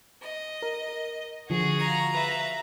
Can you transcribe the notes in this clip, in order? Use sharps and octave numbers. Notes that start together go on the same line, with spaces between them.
D#5
A#4
D3 F3 F#4 G#4
F5 A#5
B4 E5